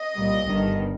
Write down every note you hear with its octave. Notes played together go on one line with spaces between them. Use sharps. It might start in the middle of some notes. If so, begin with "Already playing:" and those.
Already playing: D#5
C2 A#2 G3
G1 G2 D#3 G3